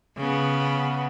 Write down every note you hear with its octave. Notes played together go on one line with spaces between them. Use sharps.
C#3 B3